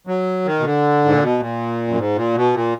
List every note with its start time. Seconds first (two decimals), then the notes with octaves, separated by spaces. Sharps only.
0.07 F#3
0.45 D#3
0.60 B2
0.64 D3
1.04 G#2
1.12 A#2
1.21 B2
1.39 A#2
1.88 F#2
1.97 G#2
2.16 A#2
2.35 B2
2.54 A#2